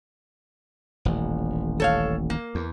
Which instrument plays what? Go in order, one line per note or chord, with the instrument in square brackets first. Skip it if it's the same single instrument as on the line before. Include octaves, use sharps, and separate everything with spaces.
[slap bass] D#1 A1
[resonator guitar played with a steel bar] A4 C#5 F5
A#3
[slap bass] E2